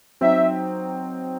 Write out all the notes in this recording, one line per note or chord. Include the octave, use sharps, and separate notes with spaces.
F#3 C4 D#4 E5